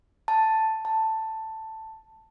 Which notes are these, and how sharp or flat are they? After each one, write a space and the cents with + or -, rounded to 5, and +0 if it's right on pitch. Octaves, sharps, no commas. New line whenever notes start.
A5 +5
A5 +10